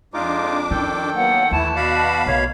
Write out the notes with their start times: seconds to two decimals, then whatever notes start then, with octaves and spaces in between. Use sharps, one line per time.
0.14 F2 G#3 D4 D#4 F4 D6
0.71 D#3 C#4 E4 A4 G5
1.15 F#3 A#3 B3 F#5
1.51 D#2 E3 A3 E4 A5
1.76 B2 F#4 D5 F5 F#5 B5
2.26 B1 A3 A#3 C#5